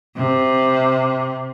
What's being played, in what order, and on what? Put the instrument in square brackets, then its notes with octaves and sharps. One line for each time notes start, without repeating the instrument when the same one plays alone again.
[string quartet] C3